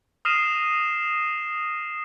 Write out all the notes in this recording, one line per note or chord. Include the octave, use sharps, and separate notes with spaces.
D#6 F6 A#6 C7 D#7 E7